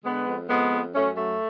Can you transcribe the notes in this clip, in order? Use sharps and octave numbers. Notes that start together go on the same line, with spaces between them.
D3 G#3 B3
F2
F2 G#3 B3
F2
F#2 A3 C#4
F#3 A3